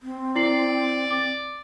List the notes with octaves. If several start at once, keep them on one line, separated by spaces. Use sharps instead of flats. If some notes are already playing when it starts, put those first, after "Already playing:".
C4
E4 D5 C7 F#7
D6 A6